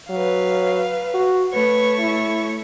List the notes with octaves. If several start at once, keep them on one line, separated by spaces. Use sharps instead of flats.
F#3 B4 F5
F#4
A3 B4 C#5 C#6
E4